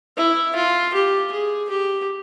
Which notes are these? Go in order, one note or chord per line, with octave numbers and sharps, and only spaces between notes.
E4
F4
G4
G#4
G4